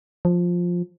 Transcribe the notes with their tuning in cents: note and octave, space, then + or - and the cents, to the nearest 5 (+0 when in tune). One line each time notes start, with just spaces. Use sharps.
F3 +10